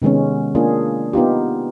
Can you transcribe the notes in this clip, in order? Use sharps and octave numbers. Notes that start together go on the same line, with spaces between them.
C3 D#3 G#3 B3 C#4
A#3 D4 F4 G#4
B3 D#4 F4 G4